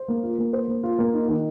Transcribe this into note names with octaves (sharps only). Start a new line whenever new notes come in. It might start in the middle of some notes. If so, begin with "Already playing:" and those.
Already playing: C5
A#3
F4
A#3
C5
A#3
F4
A#3
D#4
D#3